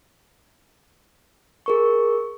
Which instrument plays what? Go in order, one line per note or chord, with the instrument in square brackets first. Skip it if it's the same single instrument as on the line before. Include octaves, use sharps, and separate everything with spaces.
[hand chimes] G#4 A#4 C#6